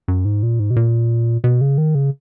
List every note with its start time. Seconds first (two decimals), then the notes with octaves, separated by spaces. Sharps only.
0.08 F#2
0.25 G#2
0.43 A#2
0.59 G#2
0.70 B2
0.76 A#2
1.44 B2
1.61 C#3
1.78 D#3
1.95 C#3